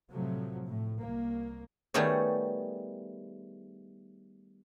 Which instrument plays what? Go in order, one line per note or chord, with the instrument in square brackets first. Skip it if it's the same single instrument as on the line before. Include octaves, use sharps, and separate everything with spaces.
[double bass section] A2 C3 F3 F#3 A3
A2
C2 A#3
[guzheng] D#3 G3 A3 B3 G#4 C#5